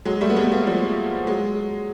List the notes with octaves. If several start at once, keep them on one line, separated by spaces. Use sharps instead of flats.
F#3 G#3
G3 A3
B3
G#3 A#3
A3 B3
F3 G3
F#3 G#3